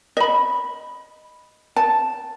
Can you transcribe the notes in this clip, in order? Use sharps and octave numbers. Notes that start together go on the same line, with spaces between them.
D#5 B5
A5